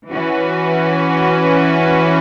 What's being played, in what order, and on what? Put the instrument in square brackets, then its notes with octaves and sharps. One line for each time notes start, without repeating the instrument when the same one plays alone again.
[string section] E3 C#4 F#4 B4